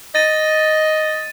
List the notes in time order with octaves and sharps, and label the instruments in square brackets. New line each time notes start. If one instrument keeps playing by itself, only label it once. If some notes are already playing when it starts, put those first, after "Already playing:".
[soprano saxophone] D#5 [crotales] A6 D#7